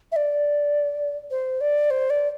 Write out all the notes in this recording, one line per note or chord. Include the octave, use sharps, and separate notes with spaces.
E5
D5
C5
D5
C5
D5